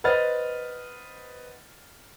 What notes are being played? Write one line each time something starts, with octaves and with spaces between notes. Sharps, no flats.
B4 C5 D#5 F#5 F6 A6